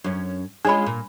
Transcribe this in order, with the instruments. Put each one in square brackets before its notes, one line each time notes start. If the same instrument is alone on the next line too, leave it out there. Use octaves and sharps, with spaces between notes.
[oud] F#2 C#4
[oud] G#3 C#4 F4 [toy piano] D4 B5
[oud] A#2